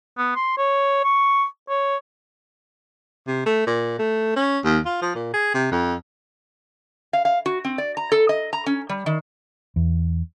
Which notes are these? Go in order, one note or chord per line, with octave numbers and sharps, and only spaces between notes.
B3
C6
C#5
C#6
C#5
C3
A3
A#2
A3
C#4
D#2
F4
F3
A#2
G#4
C3
F2
F5
F5
F#4
C4
D5
A#5
A4
D#5
A#5
C#4
G3
D#3
E2